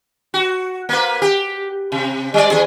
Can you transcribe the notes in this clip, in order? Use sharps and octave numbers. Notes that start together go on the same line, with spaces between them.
F#4
A#3 B4
G4
C3
G3 D5
E2 G#4